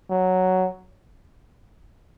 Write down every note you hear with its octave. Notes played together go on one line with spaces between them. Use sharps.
F#3